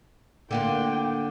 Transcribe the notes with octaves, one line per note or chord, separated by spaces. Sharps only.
D3 A#3 F4 G5